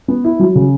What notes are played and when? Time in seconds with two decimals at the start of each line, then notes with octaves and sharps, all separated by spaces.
0.08 B3
0.24 E4
0.39 F#3
0.55 C#3